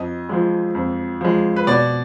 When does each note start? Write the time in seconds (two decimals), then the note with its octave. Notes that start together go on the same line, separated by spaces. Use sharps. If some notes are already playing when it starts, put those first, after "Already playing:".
Already playing: F2 D#5
0.29 F3 G#3
0.75 F2
1.21 F3 G#3
1.56 B4
1.67 B2 D5